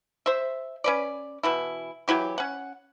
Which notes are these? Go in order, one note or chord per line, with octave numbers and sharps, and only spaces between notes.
C5 E5
C#4 B4 D5
B2 E3 E4
E3 F#3 E4 G4
C#4 F#5